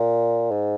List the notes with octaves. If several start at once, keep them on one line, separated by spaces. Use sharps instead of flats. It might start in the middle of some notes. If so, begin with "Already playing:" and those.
Already playing: A#2
G#2